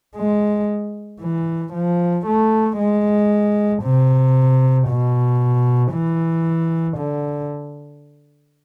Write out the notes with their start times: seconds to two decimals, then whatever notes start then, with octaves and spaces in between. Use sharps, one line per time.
0.17 G#3
1.21 E3
1.73 F3
2.26 A3
2.79 G#3
3.83 C3
4.88 B2
5.93 E3
6.98 D3